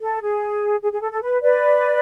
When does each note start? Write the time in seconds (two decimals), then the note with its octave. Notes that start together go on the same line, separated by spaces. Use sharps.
0.01 A4
0.21 G#4
0.81 G#4
0.92 G#4
1.01 A4
1.12 A4
1.22 B4
1.42 B4 D5